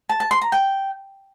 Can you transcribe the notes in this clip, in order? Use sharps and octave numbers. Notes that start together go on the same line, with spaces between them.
A5
A5
C6
A#5
G5